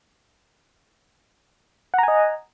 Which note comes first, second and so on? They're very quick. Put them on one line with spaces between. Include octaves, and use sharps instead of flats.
F#5 A#5 G#5 D#5